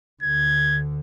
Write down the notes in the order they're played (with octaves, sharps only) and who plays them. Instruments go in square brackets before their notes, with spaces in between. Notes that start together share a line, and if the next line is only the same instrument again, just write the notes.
[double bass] D2 D3 [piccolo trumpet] G#6